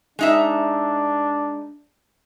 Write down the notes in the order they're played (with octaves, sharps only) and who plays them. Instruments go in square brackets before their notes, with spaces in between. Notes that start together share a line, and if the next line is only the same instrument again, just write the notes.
[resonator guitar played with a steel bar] G#3 D#4 E5 [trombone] D4